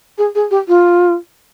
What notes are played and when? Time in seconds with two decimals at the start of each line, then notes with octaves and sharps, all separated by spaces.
0.18 G#4
0.35 G#4
0.51 G4
0.68 F4